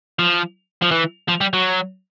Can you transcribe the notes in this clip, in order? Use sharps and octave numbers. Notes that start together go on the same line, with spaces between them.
F3
F3
E3
F3
G3
F#3